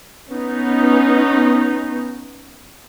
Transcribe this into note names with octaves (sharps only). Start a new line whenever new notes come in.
B3 C#4 D#4